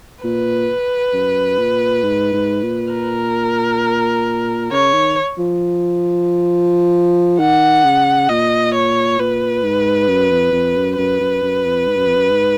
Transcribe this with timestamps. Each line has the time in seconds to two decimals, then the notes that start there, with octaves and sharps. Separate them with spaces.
0.24 A#2 B4
1.13 F#2
1.58 A#2
2.03 G#2
2.33 G#2
2.63 A#2
2.93 A#4
4.71 C#3 C#5
4.94 D#3
5.38 F3
7.39 D#3 F#5
7.85 C#3
8.29 A#2 D#5
8.74 C#5
9.19 A#2 B4
9.63 G#2
10.08 F#2
10.30 F2
10.52 F2
10.76 F#2
10.97 F#2 B4
11.20 F#2
11.42 F#2
11.64 F2
11.87 G#2
11.96 F#2
12.06 F2
12.15 F#2
12.31 G#2